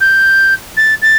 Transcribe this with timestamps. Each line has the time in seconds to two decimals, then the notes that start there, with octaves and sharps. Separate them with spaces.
0.01 G6
0.77 A6
1.02 A6